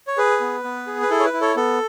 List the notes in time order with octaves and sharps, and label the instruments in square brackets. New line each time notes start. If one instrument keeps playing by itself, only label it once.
[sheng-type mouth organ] C#5
G#4 B4
B3
B3
G#4
B4
E4 A4
C#5
B4
E4
A4 C#5
B3 A4